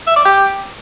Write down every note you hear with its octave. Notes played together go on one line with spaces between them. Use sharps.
E5
D5
G4